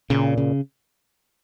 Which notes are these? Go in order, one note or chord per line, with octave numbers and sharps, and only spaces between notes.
A#2 C#3
C#3